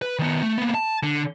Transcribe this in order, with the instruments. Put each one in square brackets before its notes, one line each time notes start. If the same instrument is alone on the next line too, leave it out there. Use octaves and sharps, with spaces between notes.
[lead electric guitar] B4
D#3 B3
A3
A#3 B3
A5
D3